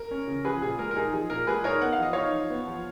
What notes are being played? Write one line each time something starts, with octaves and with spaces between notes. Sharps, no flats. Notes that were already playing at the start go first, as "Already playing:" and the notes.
Already playing: A#4
C#4
C#3
F3 G#4 B4
A#2 G#4
G#3 A#4
A#4
D#4 G#4
F3 G#4
A#2 A#4
G#3 G#4 B4
D#4 A#4 C#5
B3 F#5
F5
F3 D#5
D#4 C#5 F5
F3
B3
F3